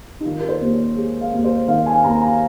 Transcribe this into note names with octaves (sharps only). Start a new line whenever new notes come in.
D#4
D#3 F4
A#4
C5
D#2
C#5
G#3
F5
D#2
C5
D#3 F5
G#5
D#2 A#5
A#5